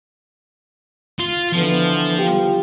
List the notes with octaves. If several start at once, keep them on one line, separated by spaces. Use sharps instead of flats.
F4
D3 E3 F3 B3
F4 G4